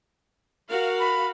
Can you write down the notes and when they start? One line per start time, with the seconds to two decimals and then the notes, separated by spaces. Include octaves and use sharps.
0.68 F#4 A#4 F5
1.00 B5